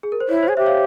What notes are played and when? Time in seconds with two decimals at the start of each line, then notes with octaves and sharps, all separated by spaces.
0.03 G#4
0.12 A#4
0.20 C5
0.29 E4 C#5
0.43 C5
0.48 G#4
0.57 G4 C5 E5
0.66 C#5 F5